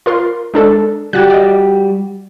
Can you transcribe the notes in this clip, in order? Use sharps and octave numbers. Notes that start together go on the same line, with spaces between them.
F4 A#4 C6
G#3 D4 A4
G3 F#4 G4 F#6 A6
D5 D#5